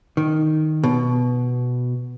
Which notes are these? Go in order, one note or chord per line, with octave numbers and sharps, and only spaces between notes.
D#3
B2